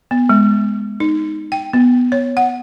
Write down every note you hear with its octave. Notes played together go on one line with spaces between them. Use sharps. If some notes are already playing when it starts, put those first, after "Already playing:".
B3
G#3
D#4
G5
B3
C#5
F#5